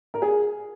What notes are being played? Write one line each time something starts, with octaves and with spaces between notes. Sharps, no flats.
A#4
G#4